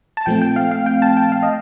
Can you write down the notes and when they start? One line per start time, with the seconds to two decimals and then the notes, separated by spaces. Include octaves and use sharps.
0.17 A5
0.26 A#2 F3 A3 C4 G5
0.42 G5
0.56 F5
0.71 F5
0.86 G5
1.02 A5
1.17 G5
1.32 F5
1.43 D#5